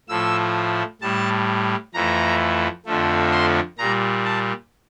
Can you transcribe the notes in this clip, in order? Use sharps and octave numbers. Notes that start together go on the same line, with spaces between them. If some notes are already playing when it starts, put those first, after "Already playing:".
A2 F3 A3 E6
A2 G3 A5
F2 E3 A3 A#5
F2 D3 F3 A3
C6
A#2 G3 A#5
A5